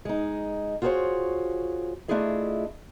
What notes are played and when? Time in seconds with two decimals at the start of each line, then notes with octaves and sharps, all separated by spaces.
0.05 G#3 D#4
0.82 F4 F#4 G#4 A#4 C5 C#5
2.08 A3 D4 E4 F4 G#4 D#5